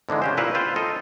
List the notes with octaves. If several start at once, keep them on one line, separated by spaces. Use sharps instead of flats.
G#2 D3 E3 G#3
C#3 G4 C5
A#2 E4 B4 E5 F5 A#5
F4 B4 C5 F5 G5
F4 A4 D#5